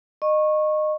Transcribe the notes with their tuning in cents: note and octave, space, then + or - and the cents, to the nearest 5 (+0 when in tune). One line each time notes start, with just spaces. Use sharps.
D#5 -25 C#6 -20